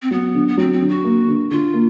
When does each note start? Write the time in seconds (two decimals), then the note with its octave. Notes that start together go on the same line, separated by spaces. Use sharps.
0.02 C4
0.11 F#3 B3
0.34 D3
0.48 B3
0.57 F#3 C4
0.73 C4
0.81 D3
0.89 F#4
1.04 A#3
1.28 D3
1.51 D3 F4
1.74 A#3